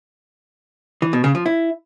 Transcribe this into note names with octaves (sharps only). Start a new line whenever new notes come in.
E3
B2
C#3
F3
E4